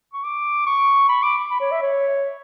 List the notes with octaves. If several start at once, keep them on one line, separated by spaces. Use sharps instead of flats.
C#6
D6
C#6
B5
D6
B5
C#5
E5
C#5